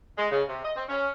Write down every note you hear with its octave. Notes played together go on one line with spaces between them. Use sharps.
G#3
C#3
C3
D#5
C4
C#4